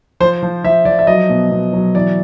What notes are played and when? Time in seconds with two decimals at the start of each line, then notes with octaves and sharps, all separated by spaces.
0.20 F3 C5
0.43 F3
0.64 F3 E5
0.85 F3 D5
0.99 E5
1.07 F#3 D#5
1.30 B2
1.51 B2
1.73 F#3
1.95 E3 D5